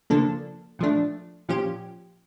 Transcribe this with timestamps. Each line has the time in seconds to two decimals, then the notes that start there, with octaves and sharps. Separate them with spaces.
0.10 C#3 F3 A#3 D4 A4
0.79 A#2 F3 A3 D4
1.49 A#2 F3 C#4 G4